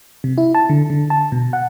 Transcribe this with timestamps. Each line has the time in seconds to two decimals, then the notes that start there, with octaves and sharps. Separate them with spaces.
0.24 C3
0.38 E4
0.55 A5
0.69 D3
0.90 D3
1.10 A5
1.32 B2
1.53 F#5